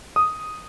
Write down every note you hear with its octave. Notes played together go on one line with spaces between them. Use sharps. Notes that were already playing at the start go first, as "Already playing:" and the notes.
D#6